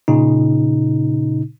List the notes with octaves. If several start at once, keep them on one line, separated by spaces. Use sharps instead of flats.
A#2 C#3 D#4